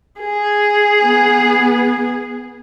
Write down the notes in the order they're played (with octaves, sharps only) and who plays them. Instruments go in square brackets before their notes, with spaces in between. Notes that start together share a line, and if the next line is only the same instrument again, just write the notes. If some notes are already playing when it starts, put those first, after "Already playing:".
[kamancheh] G#4
[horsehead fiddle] B3